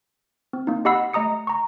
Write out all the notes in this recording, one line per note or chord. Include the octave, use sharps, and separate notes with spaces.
C4
A#3 D#4
G4 D#5 F#5 B5 E6 C7
A3 D#5 A#5 D#6 C#7
A#5 C#6